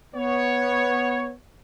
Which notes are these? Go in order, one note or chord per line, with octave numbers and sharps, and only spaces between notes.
B3 C#5